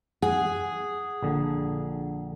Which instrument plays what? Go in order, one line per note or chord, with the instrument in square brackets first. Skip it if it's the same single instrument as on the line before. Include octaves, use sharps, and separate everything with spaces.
[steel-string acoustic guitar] G#4 [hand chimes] F#5
[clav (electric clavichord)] A#1 D3